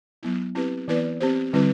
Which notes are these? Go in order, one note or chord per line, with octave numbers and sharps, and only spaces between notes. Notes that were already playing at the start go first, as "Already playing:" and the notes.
F#3 B3 E4
C4 E4 G4 B4
E3 B3 E4 B4 D5
C4 G4 C5
D3 G3 C4 E4 B4